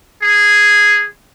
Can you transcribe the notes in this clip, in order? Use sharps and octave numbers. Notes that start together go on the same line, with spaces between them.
G#4